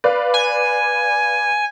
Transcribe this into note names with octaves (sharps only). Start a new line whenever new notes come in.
B4 D5 F5
G#5